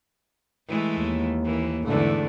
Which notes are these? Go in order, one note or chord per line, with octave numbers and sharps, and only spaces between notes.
E3 G#3 A3
D#2
E3 A#3
E2 G#2 D3 A3